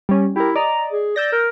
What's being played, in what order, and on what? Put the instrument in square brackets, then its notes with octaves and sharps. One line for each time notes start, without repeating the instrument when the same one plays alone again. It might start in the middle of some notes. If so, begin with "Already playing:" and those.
[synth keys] G3 C#4
[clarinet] E4 [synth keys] G4 A#4
[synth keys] D5 D#5 [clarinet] A#5
[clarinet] G#4
[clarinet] D5 [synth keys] E6 G6 A#6
[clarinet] A#4